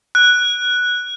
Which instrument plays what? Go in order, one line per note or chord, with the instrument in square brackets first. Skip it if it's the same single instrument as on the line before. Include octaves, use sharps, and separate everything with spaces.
[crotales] F#6